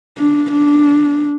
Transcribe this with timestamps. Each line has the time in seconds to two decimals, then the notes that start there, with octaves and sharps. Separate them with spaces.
0.18 D4
0.52 D4